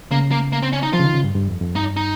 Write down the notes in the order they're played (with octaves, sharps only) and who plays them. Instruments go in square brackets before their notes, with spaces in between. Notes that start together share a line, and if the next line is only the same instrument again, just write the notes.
[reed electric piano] C#3 [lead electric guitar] A#3
[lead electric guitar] A#3
A#3
C4
C#4
D#4
[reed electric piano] F3 [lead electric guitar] F4
[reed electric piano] C#3
D#3
C#3
G2
G2
F2
F2
[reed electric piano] G2 [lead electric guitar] D#4
[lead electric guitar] D#4